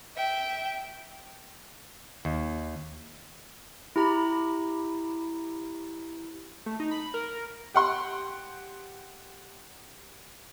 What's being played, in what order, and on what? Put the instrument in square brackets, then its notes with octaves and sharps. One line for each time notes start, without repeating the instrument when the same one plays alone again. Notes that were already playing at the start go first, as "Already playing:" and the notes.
[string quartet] E5 G5
[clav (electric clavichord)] D#2
[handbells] E4 G4 A#5 B5
[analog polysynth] A3
D#4
B5
A#4
[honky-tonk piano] G4 F#5 C6